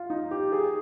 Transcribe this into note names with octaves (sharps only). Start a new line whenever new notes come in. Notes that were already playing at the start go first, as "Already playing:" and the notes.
Already playing: F4
D#4
G4
G#4